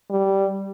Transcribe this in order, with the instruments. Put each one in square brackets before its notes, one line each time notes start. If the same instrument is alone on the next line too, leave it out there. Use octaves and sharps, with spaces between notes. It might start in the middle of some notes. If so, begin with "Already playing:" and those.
[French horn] G3